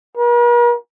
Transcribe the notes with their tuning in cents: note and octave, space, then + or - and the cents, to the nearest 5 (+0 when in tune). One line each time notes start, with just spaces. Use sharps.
A#4 +45